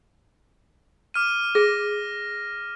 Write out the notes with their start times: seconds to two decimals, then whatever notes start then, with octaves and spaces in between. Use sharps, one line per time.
1.14 D6 F6 D#7
1.55 G#4 A#6